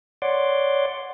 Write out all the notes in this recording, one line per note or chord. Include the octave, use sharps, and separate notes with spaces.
C#5 D5 F#5 C6 D6